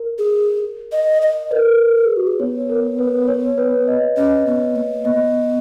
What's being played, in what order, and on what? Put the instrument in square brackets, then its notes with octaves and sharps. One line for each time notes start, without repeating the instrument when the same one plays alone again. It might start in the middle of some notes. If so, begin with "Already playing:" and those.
Already playing: [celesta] A#4
[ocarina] G#4
D#5
D#5
[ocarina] A#4 [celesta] B4
[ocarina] A#4
G#4
F#4
G#4
[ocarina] B3 [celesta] C#5
[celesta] A#4
B4
C#5
B4
D#5
[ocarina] C#4 [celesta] D#5
[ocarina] B3
A#3
[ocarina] B3 [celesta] D#5